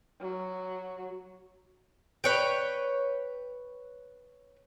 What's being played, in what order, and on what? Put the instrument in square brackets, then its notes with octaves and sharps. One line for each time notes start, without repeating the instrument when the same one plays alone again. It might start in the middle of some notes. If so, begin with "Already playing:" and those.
[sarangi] F#3
[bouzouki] B4 C#5 G5